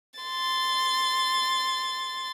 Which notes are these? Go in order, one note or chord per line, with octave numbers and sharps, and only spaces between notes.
C6 A6